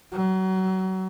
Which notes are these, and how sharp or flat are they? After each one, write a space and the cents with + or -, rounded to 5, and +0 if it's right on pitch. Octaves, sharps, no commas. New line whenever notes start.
F#3 +30